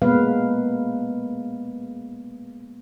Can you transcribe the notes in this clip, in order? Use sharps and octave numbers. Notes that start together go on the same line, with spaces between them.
G#3 A#3 B3 B4 F5